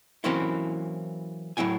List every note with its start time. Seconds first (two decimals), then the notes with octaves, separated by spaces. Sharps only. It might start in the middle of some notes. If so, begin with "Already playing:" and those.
0.24 E3 F#3 A#3 C4 C#4 E4
1.57 A2 F#3 E4 G5 G#5